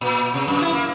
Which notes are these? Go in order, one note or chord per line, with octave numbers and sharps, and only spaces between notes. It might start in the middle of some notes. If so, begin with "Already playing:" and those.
A#2
C3
F#2
E4
A#3